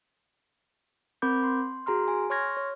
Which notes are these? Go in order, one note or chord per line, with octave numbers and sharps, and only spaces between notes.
C4 A#4 B5 D6 G6
C6
F#4 G#4 A#5 C6 F6
G#5
C#5 C6 C#6 F6 G#6 A#6
C#5